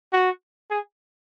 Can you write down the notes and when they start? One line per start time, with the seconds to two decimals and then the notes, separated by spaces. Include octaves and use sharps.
0.13 F#4
0.70 G#4